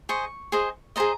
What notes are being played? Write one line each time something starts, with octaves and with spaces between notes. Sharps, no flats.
G#4 C5 D#5 C#6
G#4 C5 D#5
G#4 C5 D#5 A#5